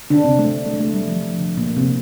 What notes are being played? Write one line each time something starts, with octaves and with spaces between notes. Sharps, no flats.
D3 D4
C3 C4
A3
A3
A3
G3
F3
F3
D3
A#2 A#3
C3 C4